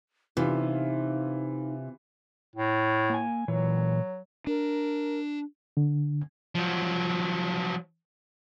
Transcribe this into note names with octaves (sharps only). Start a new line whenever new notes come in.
C3 E3 D4 D#4 F4
A2
A#3 G#5
A#2 E3 F#3 C#5
D4 A#4
D3
F3 F#3